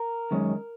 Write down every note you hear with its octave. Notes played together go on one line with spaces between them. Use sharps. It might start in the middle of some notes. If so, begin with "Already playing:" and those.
Already playing: A#4
F#2 D#3 G#3 C#4